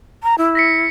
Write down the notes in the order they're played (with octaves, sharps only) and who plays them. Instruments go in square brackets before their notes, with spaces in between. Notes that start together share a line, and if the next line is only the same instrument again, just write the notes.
[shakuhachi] A#5
E4
[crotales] A#6 B6 C#7